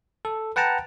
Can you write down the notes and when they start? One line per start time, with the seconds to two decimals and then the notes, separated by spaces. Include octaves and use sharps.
0.25 A4
0.56 B4 F#5 G5 A5 A#5